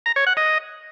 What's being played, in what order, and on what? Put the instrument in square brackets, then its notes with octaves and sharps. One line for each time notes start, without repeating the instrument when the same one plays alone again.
[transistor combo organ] A#5
C#5
F#5
D#5